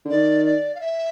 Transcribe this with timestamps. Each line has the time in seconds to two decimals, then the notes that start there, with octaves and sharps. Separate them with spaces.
0.05 D3
0.10 D#3 D5
0.45 D5
0.75 F5
0.81 E5